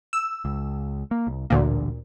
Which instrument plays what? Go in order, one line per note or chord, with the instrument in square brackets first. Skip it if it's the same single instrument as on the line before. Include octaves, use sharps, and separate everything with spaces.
[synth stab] E6
[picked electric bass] C#2
A#3
C2
[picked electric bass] A1 D3 [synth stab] D2 A#2